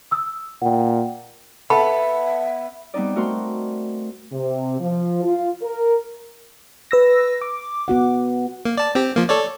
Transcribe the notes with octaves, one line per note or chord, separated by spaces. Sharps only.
D#6 E6
A#2 F#5 G5
B3 A4 E5 B5
G3 B3 C4 D#4 D5
A3 F#4 A#4 C5 C6
C3
F3
F4
A#4
B4 E6 A#6
D6
B3 F#4 F#5
A#3
D5 A5
C4 G4
F3 A#3
A4 C#5 D5